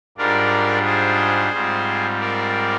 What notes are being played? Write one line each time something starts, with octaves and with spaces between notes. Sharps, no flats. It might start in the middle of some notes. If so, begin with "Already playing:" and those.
G#2 G3 D4 F4 A#4 D5
G#4 C5
G#2 G3 C4 F4
A#4 D5